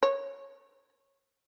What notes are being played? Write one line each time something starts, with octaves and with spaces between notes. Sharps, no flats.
C#5